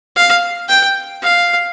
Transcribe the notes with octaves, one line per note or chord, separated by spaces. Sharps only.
F5
G5
F5